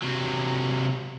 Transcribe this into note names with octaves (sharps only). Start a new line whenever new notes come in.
C3 F#3